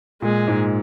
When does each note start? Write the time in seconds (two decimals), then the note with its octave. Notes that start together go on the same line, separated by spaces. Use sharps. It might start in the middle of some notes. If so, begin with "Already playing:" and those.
0.22 A#2 G#3
0.47 G#2